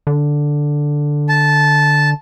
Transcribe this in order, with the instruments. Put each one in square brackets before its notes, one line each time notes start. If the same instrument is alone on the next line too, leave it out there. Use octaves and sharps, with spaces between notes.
[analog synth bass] D3
[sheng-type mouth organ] A5